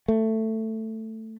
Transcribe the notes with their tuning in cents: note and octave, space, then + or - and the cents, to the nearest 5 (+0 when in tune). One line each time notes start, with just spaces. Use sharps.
A3 +10